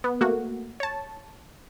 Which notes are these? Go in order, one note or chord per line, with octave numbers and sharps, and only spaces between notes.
B3
A3 A#3 F#4
C#5 A5